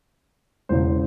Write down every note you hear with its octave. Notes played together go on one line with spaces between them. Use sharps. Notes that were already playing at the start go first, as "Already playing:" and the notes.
E1 E2 C#3 C5